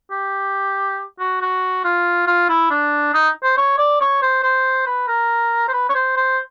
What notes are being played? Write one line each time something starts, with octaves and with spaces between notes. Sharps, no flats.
G4
F#4
F#4
F4
F4
E4
D4
D#4
C5
C#5
D5
C#5
C5
C5
B4
A#4
C5
B4
C#5
C5
C5